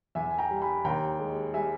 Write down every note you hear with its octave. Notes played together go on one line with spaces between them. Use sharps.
E2 E5 G#5
G#5
G5 A#5
G3
G#5 B5
D#2 G5 A#5
G#3
G3 E5 G#5